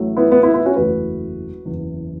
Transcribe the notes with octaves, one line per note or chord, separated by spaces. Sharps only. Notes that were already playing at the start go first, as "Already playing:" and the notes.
Already playing: A1 A2 F#3 A3
B3 E4
B3 E4
B3 E4
B3 E4
C#4 F#4
F#1 E2 E3 A3 F#4 B4
F#1 E2 E3